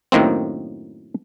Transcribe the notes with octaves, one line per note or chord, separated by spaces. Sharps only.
F#2 A2 D#3 A#3 C4